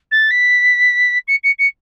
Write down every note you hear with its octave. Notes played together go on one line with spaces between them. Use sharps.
A6
B6
C#7
C#7
C#7